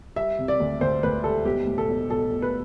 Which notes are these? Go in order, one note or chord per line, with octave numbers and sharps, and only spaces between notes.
G3 E5
C3
D5
D2
D2 C5
D2 B4
G3 A4
B1 G4
A2
A4
B1
B1 A4
B1
B4